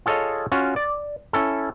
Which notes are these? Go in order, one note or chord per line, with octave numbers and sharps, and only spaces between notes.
F4 G#4 A4 C#5 D#5 F5
C#4 F4 F#4
D5
C#4 E4 A4